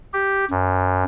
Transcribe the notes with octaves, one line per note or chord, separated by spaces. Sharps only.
G4
F#2